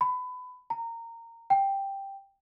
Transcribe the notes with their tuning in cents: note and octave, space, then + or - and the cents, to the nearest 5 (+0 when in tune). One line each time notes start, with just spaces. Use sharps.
B5 +25
A#5 -20
G5 +5